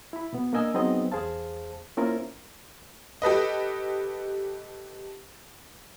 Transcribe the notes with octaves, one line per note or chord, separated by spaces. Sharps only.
E4 B5
B2 B3
A#3 D4 A#4 D#5 G#5 E6
F#3 B3 C4 D#4 G#4 D#5
E2 G#4 C5 F5 A5
A#3 C#4 E4 F4 A#4 C5
G4 A4 B4 D#5